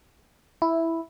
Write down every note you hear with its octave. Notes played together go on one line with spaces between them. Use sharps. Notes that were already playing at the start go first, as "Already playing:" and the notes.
E4